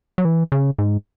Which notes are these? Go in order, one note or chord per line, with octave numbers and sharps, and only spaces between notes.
F#3
E3
C#3
G#2